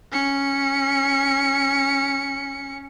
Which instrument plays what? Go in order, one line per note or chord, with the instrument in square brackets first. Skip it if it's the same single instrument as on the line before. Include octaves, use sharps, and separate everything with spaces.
[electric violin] C#4 C#7